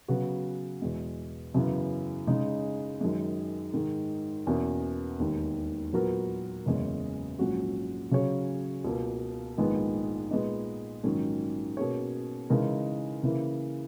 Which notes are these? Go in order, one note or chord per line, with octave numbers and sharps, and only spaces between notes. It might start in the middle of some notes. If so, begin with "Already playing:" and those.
C#3 F#3 B3 F#4
E2 B2 G#3
F#2 C#3 E3 B3
C#3 G#3 D#4 G#4
F#2 D#3 G#3
G#2 D#3 G#3
E2 B2 A#3 C#4
E1 D#2 D#3
A#2 F#3 B3 F#4 A#4
F#1 E2 C#3 G#3 C#4
A#1 G#2 F#3 C#4 F#4
C#3 F#3 C#4 G#4 C#5
C#2 B2 A#3
A#1 G#2 D#3 G#3 B3
A#2 G#3 B3 D#4
A#1 G#2 D#3 F#3 C#4
B2 A#3 C#4 G#4 C#5
C#3 E3 G#3 D#4 A#4
C#3 E3 A#3 E4